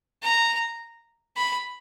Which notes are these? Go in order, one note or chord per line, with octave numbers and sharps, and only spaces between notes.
A#5
B5